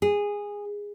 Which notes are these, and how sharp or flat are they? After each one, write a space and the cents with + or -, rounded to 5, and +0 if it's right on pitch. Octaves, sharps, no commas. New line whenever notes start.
G#4 -15